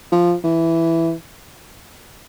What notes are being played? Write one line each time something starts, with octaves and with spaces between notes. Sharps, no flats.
F3
E3